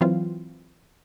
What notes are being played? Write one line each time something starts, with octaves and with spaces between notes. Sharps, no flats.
E3 F#3 C4 F4